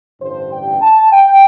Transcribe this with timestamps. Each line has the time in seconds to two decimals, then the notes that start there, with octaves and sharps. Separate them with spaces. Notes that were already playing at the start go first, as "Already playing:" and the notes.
0.21 A1 G2 D3 C5
0.51 G5
0.82 A5
1.12 G5